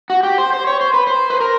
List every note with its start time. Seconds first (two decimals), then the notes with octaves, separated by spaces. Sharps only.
0.10 F#4
0.23 G4
0.38 C5
0.53 C5
0.67 C#5
0.81 C5
0.94 B4
1.07 C5
1.30 B4
1.40 A#4